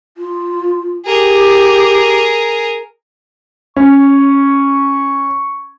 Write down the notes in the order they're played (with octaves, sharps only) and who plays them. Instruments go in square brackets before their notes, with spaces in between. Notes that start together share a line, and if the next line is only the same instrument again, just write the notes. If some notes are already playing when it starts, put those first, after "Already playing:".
[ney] F4
[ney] G4 [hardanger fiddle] G#4 A#4
[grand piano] C#4 [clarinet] C#6